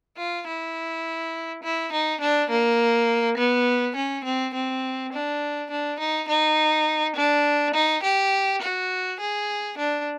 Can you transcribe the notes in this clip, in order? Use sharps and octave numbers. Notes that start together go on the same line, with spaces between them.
F4
E4
E4
D#4
D4
A#3
B3
C#4
C4
C4
D4
D4
D#4
D#4
D4
D#4
G4
F#4
G#4
D4